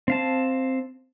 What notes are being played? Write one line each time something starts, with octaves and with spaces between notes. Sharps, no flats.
C4 F5 A5